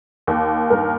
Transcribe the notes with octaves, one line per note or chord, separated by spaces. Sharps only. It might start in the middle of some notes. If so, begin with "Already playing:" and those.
D#2
G2 A#4